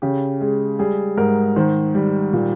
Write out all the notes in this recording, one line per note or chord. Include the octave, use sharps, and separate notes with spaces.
C#3 G4
G#3
G3 G#4
G#2 A#4
D#3 C5
G3
A#2